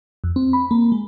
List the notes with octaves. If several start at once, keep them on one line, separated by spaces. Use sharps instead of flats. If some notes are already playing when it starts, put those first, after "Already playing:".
F2
C4
B5
A#3
G#3